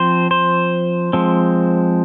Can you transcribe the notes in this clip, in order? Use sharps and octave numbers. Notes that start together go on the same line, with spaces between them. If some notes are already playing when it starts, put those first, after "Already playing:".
Already playing: F3 C4 C5
C5
F3 G#3 C4